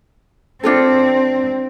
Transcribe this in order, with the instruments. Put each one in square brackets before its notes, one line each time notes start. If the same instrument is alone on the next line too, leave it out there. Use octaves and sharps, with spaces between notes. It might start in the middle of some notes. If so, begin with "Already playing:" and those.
[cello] C4 [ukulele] D4 F4 A4